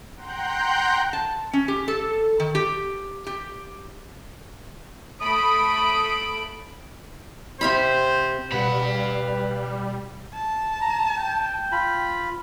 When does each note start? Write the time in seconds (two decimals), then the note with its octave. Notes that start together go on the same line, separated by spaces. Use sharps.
0.15 F#5 G5 A#5 C6 F#6 G6
1.13 A5
1.53 C#4
1.68 G4
1.88 A4
2.40 D#3
2.55 G4
3.27 G4
5.21 A3 B5 D#6 D7
7.61 C3 C5 F5 B5
8.52 B2 G3 B4 F5 F#5 B5
10.34 A5
10.81 A#5
11.18 G5
11.72 F4 B5